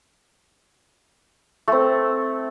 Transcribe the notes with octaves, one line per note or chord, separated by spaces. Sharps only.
A3 C4